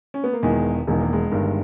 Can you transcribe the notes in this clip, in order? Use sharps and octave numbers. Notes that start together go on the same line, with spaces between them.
C#4
B3
A#3
E1 E2 D#3 G#3
E1 E2 D#3 G#3
A#3
G#3
G1 G2 D#3